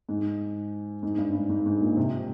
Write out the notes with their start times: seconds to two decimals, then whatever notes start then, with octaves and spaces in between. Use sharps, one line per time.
0.09 G#2
1.03 G#2
1.18 G2
1.35 G#2
1.49 G#2
1.66 G#2
1.81 A#2
1.97 C3